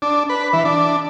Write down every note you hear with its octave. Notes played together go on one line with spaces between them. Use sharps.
D4
B4
E3
D4